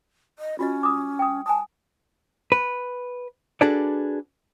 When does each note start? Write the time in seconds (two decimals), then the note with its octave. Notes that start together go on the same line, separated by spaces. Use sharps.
0.39 D#5
0.59 C#4 F4 F#4 D#5
0.83 D6 D#6
1.19 G5 D#6
1.46 G#5 A5 D#6
2.52 B4
3.61 D4 F#4 G#4 A4 B4 D5